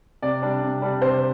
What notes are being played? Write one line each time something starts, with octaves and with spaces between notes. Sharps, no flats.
C3 D5
G3 D4
C3
G3 D4
C3 C5